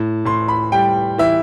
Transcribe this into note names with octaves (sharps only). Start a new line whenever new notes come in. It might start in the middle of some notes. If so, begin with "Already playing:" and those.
Already playing: A2
A2 C6
B5
G3 G5
E3 E5